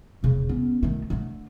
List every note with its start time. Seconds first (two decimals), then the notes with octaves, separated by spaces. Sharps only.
0.23 E1 C#3
0.49 B3 C#4
0.83 D#3 A3
1.10 D3 A3